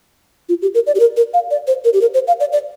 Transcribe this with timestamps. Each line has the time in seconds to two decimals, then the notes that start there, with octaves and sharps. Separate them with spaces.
0.49 F4
0.62 G4
0.74 A#4
0.87 D5
0.95 G4
1.00 A#4
1.17 A#4
1.34 F5
1.51 D5
1.67 C5
1.85 A#4
1.93 G4
2.01 A#4
2.14 C5
2.27 F5
2.40 D5
2.52 D5